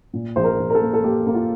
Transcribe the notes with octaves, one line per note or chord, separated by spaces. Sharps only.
A#2
A#1 C5
A#4
A#1
A#4
A4
A#3
A4
A#3 G4
A#3
F4